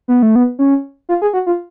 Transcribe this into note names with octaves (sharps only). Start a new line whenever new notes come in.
B3
A3
B3
C#4
F4
G#4
F#4
F4